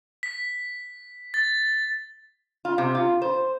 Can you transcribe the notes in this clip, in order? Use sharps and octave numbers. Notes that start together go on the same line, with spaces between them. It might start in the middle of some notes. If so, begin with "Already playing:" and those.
B6
A6
F4
C3
F4
C5